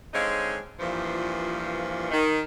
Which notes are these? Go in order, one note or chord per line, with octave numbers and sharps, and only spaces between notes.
D3 G#3 C4 D#4 C#5 F5
G2 A#2 E3 F3
D#3